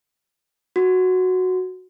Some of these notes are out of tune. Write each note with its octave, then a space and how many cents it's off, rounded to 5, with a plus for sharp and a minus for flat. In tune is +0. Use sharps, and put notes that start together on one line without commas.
F#4 -5